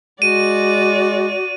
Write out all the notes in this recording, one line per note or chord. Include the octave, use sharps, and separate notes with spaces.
G#3 F#4 D5 D#7